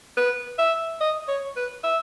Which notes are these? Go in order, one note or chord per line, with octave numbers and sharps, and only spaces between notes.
B4
E5
D#5
C#5
B4
E5